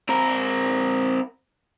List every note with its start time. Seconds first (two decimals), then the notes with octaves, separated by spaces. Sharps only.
0.09 C4 A#4